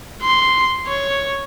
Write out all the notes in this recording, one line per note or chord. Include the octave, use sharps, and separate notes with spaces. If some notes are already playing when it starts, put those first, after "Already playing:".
C6
C#5